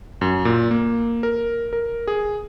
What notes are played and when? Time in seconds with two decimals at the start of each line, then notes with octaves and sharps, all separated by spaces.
0.21 F#2
0.45 A#2
0.71 A#3
1.23 A#4
1.73 A#4
2.08 G#4